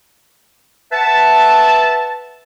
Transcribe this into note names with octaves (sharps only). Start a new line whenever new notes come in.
B4 E5 F#5 A5